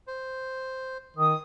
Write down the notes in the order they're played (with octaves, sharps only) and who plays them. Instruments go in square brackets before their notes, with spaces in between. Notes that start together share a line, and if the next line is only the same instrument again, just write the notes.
[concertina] C5
[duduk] D#3 [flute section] D#6